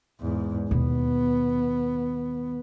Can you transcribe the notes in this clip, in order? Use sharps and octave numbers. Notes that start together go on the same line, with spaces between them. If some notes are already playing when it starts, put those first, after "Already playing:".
E2 G#2
D#2 B2 B3